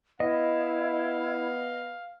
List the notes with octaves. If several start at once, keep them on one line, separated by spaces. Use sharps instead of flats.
B3 E4 D#5 F5